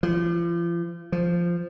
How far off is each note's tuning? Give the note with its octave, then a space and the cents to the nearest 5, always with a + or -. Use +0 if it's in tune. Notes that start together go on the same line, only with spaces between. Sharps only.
F3 -40
F3 -10